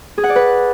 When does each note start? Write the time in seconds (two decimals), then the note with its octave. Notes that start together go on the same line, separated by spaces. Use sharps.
0.18 G#4
0.24 F#5
0.30 D5
0.36 B4